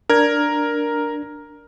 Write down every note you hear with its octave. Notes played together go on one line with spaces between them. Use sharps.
D4 A#4 G#6